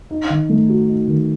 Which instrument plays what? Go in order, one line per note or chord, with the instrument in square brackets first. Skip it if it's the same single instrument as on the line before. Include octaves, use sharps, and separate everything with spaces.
[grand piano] D#4
D#3
A3
F#4
D#4
D#3